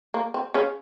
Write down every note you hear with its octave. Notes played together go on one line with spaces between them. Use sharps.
A#3
C4
C#3 C#4